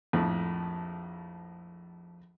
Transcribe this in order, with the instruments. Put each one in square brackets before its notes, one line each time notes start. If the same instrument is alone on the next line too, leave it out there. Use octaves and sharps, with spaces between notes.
[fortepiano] A#1 F2 A2